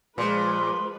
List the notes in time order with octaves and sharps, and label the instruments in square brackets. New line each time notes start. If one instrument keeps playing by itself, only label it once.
[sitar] A#2 [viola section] F3 G#3 B4 [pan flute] C6